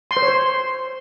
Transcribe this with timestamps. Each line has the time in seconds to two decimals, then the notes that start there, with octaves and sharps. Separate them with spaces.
0.11 C6
0.17 C5
0.22 C#5
0.28 C5